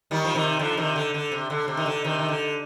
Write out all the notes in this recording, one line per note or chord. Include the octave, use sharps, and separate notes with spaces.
D#3 G3
F3
C3 D#3
D3 F3
C3 D#3
D3
D3
C3
D3
C3
D#3
D3
C3 D#3
D#3
D3